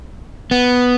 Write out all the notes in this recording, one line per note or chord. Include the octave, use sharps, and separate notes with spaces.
B3